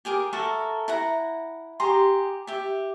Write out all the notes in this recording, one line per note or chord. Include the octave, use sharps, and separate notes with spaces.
G4 G#4 A#4 D6
F#4 A4 A#4 E5
E4 F#5 A#5
G4 G#4 A#5 C6
G4 E5